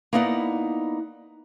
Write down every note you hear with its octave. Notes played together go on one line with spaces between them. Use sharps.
A#3 B3 D#4 E4 D5 F#5